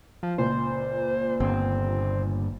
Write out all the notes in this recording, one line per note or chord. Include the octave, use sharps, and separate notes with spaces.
F3
C#2 A#2 C5
G1 C4